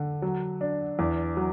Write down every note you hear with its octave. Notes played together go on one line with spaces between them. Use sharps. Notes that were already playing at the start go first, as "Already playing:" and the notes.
Already playing: D3
F#3
D4
E2
F#3